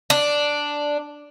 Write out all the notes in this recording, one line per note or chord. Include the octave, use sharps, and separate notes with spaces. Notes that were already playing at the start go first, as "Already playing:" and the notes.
D4